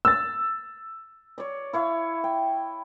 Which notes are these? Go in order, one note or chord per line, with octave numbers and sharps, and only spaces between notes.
E6 A6
C#5 D5
E4 C#5 F5
G5